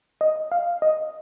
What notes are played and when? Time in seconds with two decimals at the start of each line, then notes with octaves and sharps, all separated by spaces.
0.21 D#5
0.52 F5
0.82 D#5